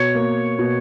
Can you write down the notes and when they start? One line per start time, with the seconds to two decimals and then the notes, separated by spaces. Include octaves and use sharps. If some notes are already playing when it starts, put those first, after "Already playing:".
Already playing: B2 C#5
0.15 A#3
0.59 B2